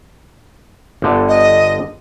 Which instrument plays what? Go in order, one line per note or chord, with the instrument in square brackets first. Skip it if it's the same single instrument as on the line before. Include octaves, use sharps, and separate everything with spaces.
[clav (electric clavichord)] G1 D3
[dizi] D#5